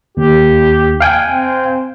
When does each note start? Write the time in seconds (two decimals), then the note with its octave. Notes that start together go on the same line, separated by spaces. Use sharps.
0.17 D#2 G4
1.01 F5 G5 G#5
1.27 C4